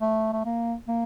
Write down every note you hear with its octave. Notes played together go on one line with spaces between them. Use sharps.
A3
A3
A#3
A#3